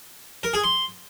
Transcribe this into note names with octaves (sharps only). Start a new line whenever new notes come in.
A#4
G#4
C6